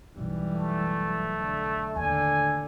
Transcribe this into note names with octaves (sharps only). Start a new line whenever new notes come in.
B1 F#2 E3 G3
A3
D3
D#2 A2 D3 G#5